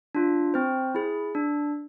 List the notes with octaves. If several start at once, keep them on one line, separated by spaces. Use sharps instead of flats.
D4 F4
C4 C5
E4 G#4
D4